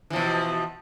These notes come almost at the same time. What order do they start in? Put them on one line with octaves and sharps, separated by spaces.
E3 F3 B2